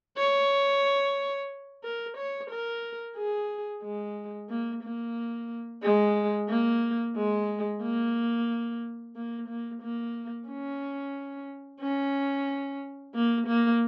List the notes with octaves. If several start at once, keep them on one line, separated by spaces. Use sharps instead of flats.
C#5
A#4
C#5
A#4
G#4
G#3
A#3
A#3
G#3
A#3
G#3
A#3
A#3
A#3
A#3
C#4
C#4
A#3
A#3